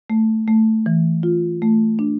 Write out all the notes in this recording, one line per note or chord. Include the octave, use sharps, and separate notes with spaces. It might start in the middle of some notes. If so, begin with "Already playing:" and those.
A3
A3
E3
F4
A3
D4